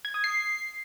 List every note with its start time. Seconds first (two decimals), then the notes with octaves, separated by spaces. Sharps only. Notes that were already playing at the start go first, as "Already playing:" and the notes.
0.05 G#6
0.14 D#6
0.24 C7